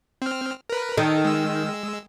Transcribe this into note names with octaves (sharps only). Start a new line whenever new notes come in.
C4 F6
A#4 B4
D#3 A4
G#3 E6